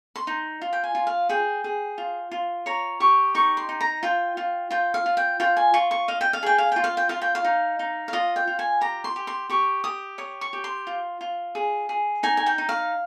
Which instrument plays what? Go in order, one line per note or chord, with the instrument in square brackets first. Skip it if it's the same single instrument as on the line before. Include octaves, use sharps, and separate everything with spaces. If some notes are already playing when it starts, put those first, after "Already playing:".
[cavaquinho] C6
D#4
F4
G5
G#5
F4
F5
G#4 G5
G#4
F4
F4
C#5 A#5
G4 C#6
D#4 C#6
C6
D#4
A#5
F4 G5
F4
F4 G5
F5
F4
G5
F4 G5
G#5
F4 C#6
C#6
D#5 F5
G5
F5
G#4 G5
F5
F4 G5
F5
G5
F4 F5
G5
F5
D#4
D#4
F5
F4 D#5
G5
F4
G#5
G4 A#5
C6
G4
C6
G4 C#6
G4 D#6
C#5 D#6
C#6
G4
C6
F4
F4
G#4
G#4
D#4 G#5
G#5
G5
D#4
F5